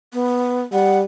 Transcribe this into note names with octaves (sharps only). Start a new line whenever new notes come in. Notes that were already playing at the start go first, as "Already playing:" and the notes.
B3
G3 F#5